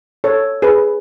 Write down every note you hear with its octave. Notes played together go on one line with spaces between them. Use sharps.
A4 C#5
G#4 B4